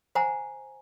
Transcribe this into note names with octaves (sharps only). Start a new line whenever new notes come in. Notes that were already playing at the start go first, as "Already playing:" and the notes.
C5 F#5 G#5 A#5